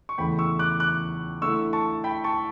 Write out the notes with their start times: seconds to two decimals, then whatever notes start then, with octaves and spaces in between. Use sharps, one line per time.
0.09 C#6
0.18 E2 C#3 E3 A3 G5 B5
0.39 C#6 E6
0.59 D6 F#6
0.80 D6 F#6
1.42 D3 A3 E4 C#6 E6
1.73 A5 C#6
2.04 G5 B5
2.24 A5 C#6